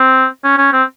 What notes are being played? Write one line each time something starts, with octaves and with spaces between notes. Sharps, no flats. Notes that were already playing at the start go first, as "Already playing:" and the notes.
Already playing: C4
C#4
C#4
C4